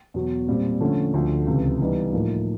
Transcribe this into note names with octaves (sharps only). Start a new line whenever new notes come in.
E2 B2 F#3
A#2 G3 C4
D3 F3 A3 C#4
D2 D3 F3
C#2 C3 E3
E3 G3 B3 D#4
A2 F3 A#3 D#4